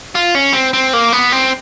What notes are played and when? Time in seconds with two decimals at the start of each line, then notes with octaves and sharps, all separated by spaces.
0.15 F4
0.35 C#4
0.53 C4
0.73 C4
0.93 A#3
1.12 B3
1.32 C4